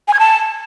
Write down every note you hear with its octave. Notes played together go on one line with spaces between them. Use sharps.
G#5
G#6
A5